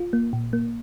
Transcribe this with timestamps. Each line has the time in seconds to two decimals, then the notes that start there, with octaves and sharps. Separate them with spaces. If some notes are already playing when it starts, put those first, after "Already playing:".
Already playing: F4
0.13 A#3
0.33 A#2
0.53 A#3